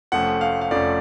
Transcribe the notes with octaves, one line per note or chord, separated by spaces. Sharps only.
F1 F2 F3 A3 C#4 F#5
F5
F5
F1 F2 F3 A3 C#4 D5